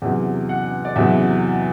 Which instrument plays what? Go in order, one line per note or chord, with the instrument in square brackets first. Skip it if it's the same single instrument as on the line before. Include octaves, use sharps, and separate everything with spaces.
[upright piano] E2 C3 F#3
F#5
D5
E2 C3 F#3 E5